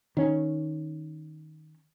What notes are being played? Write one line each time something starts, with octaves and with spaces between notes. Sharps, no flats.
D#3 C#4